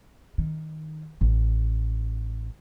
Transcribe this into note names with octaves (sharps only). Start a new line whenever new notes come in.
D#3
A1